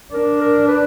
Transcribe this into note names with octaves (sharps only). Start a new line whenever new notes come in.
D4 A#4
A#4
B4